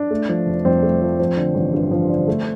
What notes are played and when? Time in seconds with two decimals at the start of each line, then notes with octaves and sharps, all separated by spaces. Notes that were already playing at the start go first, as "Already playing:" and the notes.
Already playing: D4
0.11 A3
0.29 F3
0.46 F1
0.64 F2 C4
0.83 A3
1.01 F3
1.20 F3
1.37 D3
1.55 A1
1.73 G2
1.91 F3
2.10 D3
2.28 A3